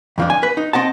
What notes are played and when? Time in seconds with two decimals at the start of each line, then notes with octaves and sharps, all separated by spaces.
0.18 F2 F3 D4
0.30 G#5
0.43 B4
0.57 D#4
0.73 C4 D#5 F#5 A5